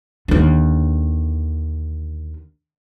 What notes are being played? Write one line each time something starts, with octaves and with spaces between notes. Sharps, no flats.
D#2 D3